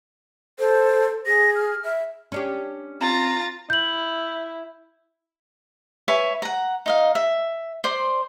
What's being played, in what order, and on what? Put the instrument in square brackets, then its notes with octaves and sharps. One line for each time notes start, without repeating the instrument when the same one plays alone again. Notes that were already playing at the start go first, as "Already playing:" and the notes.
[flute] A4 [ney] C5
[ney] G#4 [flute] A#6
[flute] F6
[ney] E5
[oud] C#4 D4 G4
[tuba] C4 [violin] F4 A6 [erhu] A#5
[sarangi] E4 [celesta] G6 F#7
[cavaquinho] B4 C#5 E5 G#5
F#5 A#5
D#4 D#5 F5
E5
C5 D5 C6